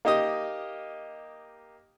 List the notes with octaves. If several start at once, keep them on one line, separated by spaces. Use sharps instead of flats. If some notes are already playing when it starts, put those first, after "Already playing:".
A#3 D#4 G4 D#5 D#6